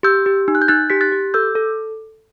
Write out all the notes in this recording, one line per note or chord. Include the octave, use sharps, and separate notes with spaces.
G4 E6 G6
G4
D#4
F#6
G6
D#4 F#6 A6
G4 B6
F#6 A6
G4
A4 E6 G6
A4